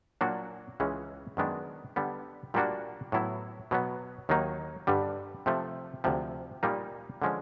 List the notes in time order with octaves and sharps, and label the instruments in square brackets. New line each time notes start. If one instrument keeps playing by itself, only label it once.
[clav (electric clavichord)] A#2 F#3 A#3 D4 F#4
C#2 C#3 E3 G#3 C#4
F#2 D#3 G#3 B3 D4
D3 G3 B3
A#2 G3 A#3 D4 F#4
A2 F#3 B3 E4
B2 F#3 B3
D#2 D#3 F#3 A#3 D#4
G2 D3 G3
C3 F3 A3
D2 C3 F3
A#2 G3 A#3 D#4
D3 F3 G#3 C#4